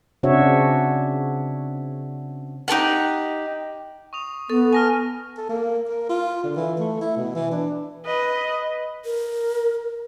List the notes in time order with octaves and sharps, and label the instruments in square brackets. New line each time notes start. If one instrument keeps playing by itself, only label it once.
[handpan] C#3 C4 D4 F#4 C#5 E5
[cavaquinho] D#4 G4 A4 F#5
[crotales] C#6 D#6 F7
[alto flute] B3 [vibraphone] A4 [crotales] C#6
[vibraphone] G#5 A5 [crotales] F6 A#6 D#7
[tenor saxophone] A4
A#3
A#4
F4
D3
E3
A3
E4
B2
E3
D4
[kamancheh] B4 D#5
[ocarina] A#4